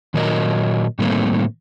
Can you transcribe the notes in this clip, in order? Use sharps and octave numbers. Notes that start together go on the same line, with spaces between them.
A#2 D#3 F#3 A#4 D#5
A2 D#3 G3 A3 A#3 C4